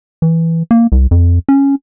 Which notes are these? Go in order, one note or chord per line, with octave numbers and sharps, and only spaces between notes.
E3
A#3
C2
F2
C#4